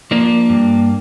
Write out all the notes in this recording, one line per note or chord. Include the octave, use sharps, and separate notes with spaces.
F3 A#3 D4
G2